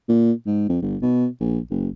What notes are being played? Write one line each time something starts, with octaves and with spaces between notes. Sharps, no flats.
A#2
G#2
F2
G1
B2
A#1
F#1